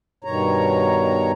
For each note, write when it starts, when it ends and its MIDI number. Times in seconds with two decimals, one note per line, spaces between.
0.24 1.32 43
0.24 1.32 47
0.24 1.32 51
0.24 1.32 73
0.24 1.32 82